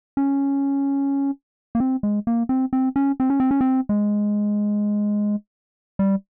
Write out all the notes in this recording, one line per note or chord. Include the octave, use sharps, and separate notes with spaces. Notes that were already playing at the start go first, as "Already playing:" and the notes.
C#4
A#3
C4
G#3
A#3
C4
C4
C#4
C4
C#4
C4
C#4
C4
G#3
G3